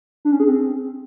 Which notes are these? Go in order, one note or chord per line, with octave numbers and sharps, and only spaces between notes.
D4
C#4
G#4
C4